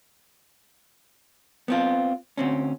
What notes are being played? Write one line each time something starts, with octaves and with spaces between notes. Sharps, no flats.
B3 C4 F4
D2 C4 C#4